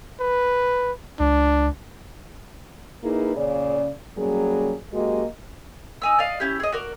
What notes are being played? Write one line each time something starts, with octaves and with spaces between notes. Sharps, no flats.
B4
C#2 D4
A#3 D#4 E4 G#4 B4
A#2 C#3 D5
F#3 G3 A#3 C#4 G#4
F#2 G#3 A#3 F#4 G4 D#5
D#4 G#5 E6
D5 D#5 F5
C#4 E4 G4
G#4 D#5
F#4 A#4 D5